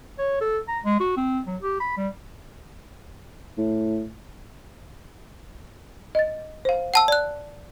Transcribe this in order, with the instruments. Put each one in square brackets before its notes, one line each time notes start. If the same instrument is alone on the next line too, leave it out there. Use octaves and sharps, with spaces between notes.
[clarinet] C#5
A4
A#5
G#3
F#4
C4
F#3
G4
B5
G3
[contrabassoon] A2
[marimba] D#5 A6
C5 F5
[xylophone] F#5 A5 E6
D5 F#6